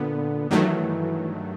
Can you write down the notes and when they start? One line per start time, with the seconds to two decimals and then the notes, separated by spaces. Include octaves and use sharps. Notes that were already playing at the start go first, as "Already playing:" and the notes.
Already playing: A#2 D3 B3
0.51 G2 D#3 E3 F#3 A3